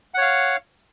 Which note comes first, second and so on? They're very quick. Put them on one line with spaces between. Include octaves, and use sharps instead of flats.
F#5 C#5 F5